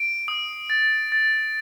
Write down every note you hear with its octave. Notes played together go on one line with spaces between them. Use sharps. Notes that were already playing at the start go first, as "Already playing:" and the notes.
Already playing: D7
D#6
A6
A6